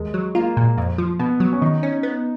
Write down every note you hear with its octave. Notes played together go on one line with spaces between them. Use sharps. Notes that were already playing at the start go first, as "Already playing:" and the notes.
Already playing: D#2 G#3
F#3
A#3 F4
A#2
F2
F3
B2 B3
F#3
C#4
D#3 D#4
C#4
B3